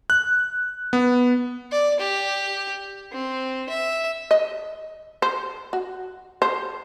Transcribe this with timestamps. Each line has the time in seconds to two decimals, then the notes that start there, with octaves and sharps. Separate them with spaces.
0.10 F#6
0.93 B3
1.71 D5
2.00 G4
3.12 C4
3.69 E5
4.31 D#5
5.22 C5
5.73 F#4
6.42 C5